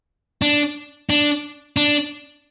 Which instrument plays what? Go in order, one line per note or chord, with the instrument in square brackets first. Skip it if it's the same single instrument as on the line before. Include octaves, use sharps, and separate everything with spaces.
[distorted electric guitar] D4
D4
D4